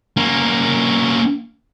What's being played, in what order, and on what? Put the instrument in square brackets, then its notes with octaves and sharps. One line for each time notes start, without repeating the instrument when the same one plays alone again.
[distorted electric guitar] A#3 C#4